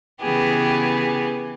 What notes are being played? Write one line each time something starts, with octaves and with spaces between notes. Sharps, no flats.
C#3 E3 B3 G4 G#4